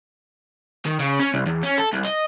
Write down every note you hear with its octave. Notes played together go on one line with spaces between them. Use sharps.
D#3
C#3
C#4
C2
E2
C#4
A4
C2
D#5